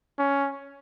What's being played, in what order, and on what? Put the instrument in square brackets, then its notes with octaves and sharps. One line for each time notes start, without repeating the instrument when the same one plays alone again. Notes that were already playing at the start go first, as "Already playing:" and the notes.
[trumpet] C#4